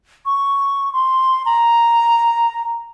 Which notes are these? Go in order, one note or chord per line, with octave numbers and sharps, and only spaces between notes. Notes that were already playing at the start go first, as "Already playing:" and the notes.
C#6
C6
A#5